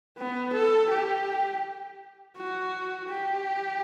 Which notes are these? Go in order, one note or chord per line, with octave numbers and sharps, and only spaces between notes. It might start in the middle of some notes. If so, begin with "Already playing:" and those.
B3
A4
G4
F#4
G4